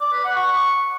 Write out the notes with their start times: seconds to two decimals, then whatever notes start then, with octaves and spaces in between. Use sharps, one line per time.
0.01 D5
0.12 B4
0.24 F#5
0.36 C#6